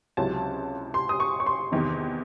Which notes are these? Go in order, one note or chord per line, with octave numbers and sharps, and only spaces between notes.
C#2 C3 F#3 C#4 E4 A5
C6
D#6
C#6
C#6
C6
E2 C3 D#3